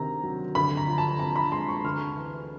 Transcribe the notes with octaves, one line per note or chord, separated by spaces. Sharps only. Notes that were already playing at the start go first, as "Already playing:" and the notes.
Already playing: D2 C3 D#3 A#5
F#3
D2 B5
A#5
F3
A5
C3 A#5
B5
G#3 C6
C#6
D2 F6
E3